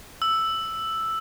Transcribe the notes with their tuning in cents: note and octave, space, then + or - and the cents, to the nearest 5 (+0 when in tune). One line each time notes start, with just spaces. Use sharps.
E6 +0